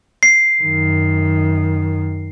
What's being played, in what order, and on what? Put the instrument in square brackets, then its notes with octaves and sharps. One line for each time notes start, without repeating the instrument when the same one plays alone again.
[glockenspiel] C7
[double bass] F#2 D#3